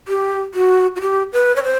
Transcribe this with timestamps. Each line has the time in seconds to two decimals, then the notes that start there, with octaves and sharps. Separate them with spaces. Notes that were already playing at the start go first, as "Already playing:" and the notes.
0.08 G4
0.54 F#4
0.96 F#4
1.01 G4
1.33 B4
1.56 C#5
1.64 C5